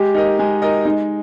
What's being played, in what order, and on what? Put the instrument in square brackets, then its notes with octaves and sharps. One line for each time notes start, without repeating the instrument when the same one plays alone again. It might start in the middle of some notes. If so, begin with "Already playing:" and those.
Already playing: [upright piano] G#3 [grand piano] G4
[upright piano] D#4 A#4 D#5
G#3
D#4 A#4 D#5
[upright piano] G#3 [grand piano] D#4